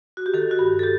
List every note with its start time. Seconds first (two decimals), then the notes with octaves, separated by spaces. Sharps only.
0.17 F#4
0.26 G4
0.34 D#3 A4
0.51 F#4
0.59 G2 G4
0.79 A4
0.83 G4